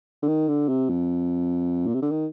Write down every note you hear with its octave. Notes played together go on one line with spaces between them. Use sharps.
D3
D#3
D3
C3
F2
A#2
C3
D3
D#3